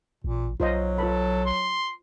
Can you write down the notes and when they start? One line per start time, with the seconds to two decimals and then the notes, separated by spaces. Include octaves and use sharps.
0.24 A1 A#2
0.60 B1 F#3 F4 C5 D#5
0.98 F4 A4 B4 B5
1.46 C6